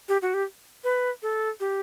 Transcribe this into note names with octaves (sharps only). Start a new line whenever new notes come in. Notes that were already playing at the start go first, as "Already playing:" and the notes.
G4
F#4
G4
B4
A4
G4